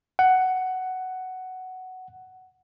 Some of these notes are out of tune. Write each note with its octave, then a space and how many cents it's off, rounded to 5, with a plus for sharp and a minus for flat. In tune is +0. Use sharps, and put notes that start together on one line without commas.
F#5 +10